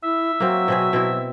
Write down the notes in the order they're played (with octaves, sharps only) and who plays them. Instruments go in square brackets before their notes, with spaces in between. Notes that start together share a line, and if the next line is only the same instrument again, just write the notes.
[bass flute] E4 [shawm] E5
[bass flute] F#3 [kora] A#3 C4
[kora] B2 C4 G#4
B2 C4 E4